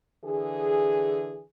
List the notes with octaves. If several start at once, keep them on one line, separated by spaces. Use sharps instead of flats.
D3 E3 G#4